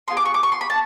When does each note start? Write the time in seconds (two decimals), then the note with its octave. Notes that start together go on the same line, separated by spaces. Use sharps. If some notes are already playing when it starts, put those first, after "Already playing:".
0.08 B3 D4 F4 G#4 C6
0.17 D6
0.25 C#6
0.34 D6
0.43 C#6
0.52 C6
0.61 B5
0.70 A5